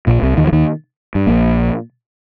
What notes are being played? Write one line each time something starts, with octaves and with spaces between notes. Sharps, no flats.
A#1 A#2
C2 C3
D#2 D#3
F3
D#2 D#3
G2
A#1 A#2